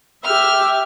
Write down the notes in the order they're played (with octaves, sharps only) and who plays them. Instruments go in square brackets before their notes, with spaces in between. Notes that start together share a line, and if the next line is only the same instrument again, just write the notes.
[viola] G4 E5 [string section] F6